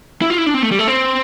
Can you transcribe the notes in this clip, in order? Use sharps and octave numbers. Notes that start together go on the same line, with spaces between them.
E4
F4
E4
D4
C4
A3
G3
A3
C4